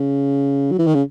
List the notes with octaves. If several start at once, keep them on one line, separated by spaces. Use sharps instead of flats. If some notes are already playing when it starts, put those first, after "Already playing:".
Already playing: C#3
F#3
E3
D#3
C#3